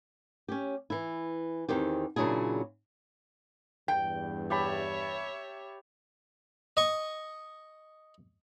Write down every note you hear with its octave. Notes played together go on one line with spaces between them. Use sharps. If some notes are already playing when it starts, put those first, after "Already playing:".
C#4 G4
E3 E4
E2 D#3 C4 G4
A#2 C#3 F#3 D4 E4 G#4
E2 G2 G5
G4 C#5 E5 A5 B5
D#5 C#6